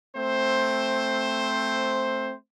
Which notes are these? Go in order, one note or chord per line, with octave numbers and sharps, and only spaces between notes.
A3 C4 C5